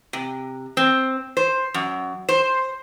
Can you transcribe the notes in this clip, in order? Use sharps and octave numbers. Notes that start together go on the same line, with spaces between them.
C3
C4
C5
F#2
C5